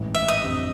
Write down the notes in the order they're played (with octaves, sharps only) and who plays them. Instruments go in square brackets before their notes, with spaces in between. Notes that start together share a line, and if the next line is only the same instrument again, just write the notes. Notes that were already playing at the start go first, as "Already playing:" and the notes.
Already playing: [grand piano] A1 G#2 E3
[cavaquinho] E5
D#5
[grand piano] F2 D3 G3 C4